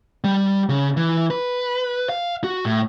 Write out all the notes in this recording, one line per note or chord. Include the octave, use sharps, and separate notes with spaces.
G3
C#3
E3
B4
F5
F#4
A2